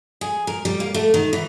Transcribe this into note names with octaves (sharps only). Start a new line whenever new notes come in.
G#4
A#4
G3
A#3
A3
D#3
E3